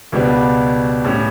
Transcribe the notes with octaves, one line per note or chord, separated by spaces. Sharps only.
C#2 B2 G3 B3 D4
A2 G3 C#4